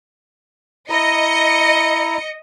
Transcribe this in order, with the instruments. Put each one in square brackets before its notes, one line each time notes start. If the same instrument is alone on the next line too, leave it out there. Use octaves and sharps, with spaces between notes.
[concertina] E4 A#5 [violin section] D#5 C#7